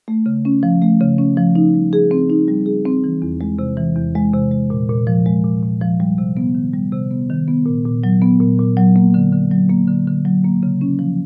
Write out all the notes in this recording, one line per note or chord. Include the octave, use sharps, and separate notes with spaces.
A3
C#3
C#4
F3
A3
C#3
C#4
F3
D#4
G3
G#4
C4
D#4
G3
G#4
C4
E3
E2
G#3
C3
E3
E2
G#3
C3
G#3
A#2
A#2
F3
G#3
A#2
A#2
F3
G3
C3
B3
D#3
G3
C3
B3
D#3
B3
A#2
A#2
F#3
B3
A#2
A#2
F#3
A#3
D3
D3
F#3
A#3
D3
D3
F#3
A#3
C#3
C#4
F3